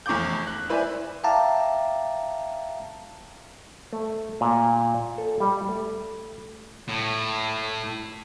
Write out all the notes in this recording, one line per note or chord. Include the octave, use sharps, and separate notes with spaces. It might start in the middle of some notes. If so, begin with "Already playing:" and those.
F1 E2 C#6 D6 G6
F#6
E4 B4 C5 D5 E5 G#5
E5 F5 G5 A5 A#5 D6
A3
A#2
A4
G3
A3
A2